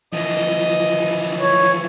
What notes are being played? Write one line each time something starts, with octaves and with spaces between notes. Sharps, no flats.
E3 F3 D#5
C#5